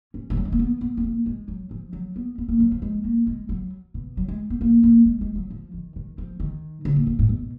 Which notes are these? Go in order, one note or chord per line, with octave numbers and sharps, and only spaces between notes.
C#4
F3
F#3
G#3
A#3
B3
B3
B3
A#3
G#3
F#3
F3
F#3
B3
B3
A#3
F#3
F3
G#3
A#3
G#3
F#3
B2
F#3
G#3
B3
A#3
A#3
G#3
G#3
F#3
F3
D#3
D#3
F3
D#3
C#3
A#2
A#2
G#2
B2